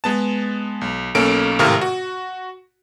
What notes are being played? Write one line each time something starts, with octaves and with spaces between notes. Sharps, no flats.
G#3 B3 A5
B1
B1 A#3 C#4 A4 D7
G#1 A2 C3 A#4 F5 F6
F#4